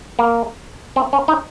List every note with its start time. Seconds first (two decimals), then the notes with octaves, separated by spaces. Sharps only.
0.19 A#3
0.96 C4
1.13 C#4
1.28 D#4